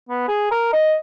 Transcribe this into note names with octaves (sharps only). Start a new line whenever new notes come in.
B3
G#4
A#4
D#5